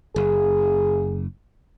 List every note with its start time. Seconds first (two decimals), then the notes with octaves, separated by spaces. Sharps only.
0.16 F#1 G#4